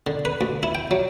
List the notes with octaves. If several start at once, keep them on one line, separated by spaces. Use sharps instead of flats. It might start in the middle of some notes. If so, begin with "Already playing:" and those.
D3
B4
D2
E4
G5
F#3